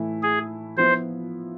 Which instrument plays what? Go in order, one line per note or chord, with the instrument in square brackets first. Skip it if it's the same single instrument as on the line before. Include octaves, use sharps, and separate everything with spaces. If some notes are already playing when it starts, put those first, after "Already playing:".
Already playing: [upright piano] A2 E3 A3 E4
[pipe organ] G#4
[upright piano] F3 B3 E4 [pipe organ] C5